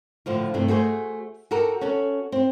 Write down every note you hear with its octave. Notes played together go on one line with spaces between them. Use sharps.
A2 D3 F3 F4
G2 C3 A3 D4
A3 F#4 G#4 C5
F#4 G4 A4 A#4
C#4 F#4 A4
C4